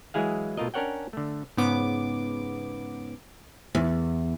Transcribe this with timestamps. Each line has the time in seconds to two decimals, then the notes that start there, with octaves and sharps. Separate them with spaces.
0.14 E3 F#3 G#3 E4 G#4 F5
0.57 B2 A3 F4 A#4 D#5
0.74 C#4 D4 A#4 C#5 F#5 G5
1.13 D3 A3
1.57 G#2 C#3 B3 D6
3.75 E2